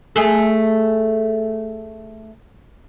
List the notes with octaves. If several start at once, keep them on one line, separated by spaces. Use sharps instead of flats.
A3 G#4 A4